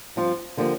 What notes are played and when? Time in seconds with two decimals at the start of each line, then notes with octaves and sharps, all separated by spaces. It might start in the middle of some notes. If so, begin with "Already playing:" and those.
0.16 G2 F3 C4 F4
0.57 D3 F3 A#3 D4 G4